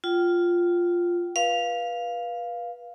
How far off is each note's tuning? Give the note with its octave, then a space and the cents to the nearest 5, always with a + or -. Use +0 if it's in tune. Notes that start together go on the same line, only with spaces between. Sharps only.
F4 +0 G5 -30
B4 -30 F5 +0